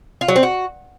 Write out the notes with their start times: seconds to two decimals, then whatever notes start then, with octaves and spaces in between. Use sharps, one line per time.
0.21 F4
0.28 F#3
0.36 C4
0.43 F#4